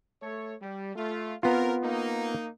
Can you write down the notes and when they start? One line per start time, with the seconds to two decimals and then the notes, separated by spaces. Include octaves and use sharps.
0.21 A3 A4 C#5
0.61 G3
0.95 A3 F4
1.43 B3 C4 F4 A#4
1.82 A#3 D#4